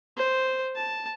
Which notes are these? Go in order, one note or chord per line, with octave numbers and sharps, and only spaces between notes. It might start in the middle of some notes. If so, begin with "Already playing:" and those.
C5
A5